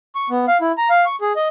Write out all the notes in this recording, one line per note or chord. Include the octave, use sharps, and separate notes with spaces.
C#6
B3
F5
E4
A#5
F5
C#6
G#4
D#5